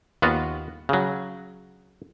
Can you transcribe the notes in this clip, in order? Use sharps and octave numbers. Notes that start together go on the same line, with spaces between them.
D#2 B3 F4 F#4
C#3 F#3